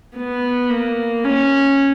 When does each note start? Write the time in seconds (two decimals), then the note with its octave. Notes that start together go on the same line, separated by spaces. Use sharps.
0.17 B3
0.70 A#3
1.24 C#4